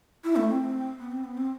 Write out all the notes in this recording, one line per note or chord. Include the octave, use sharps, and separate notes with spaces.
E4
A3
C4
B3
C4
B3
C4